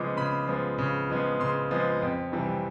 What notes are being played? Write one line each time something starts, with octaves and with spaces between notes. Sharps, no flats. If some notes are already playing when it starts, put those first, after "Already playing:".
Already playing: C#3 F3 G#3 B3 D6
C#3 B5
F3 G#3 B3
C#3
F3 G#3 B3
C#3 C6
F3 G#3 B3
F2
C3 E3 G3